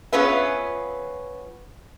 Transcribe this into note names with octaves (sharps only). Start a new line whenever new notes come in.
B3 C#4 F4 G#4 B4 E5